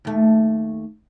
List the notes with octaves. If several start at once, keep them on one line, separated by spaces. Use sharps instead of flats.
D#2 A3